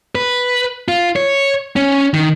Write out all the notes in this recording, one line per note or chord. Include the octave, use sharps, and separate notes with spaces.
B4
F4
C#5
C#4
D#3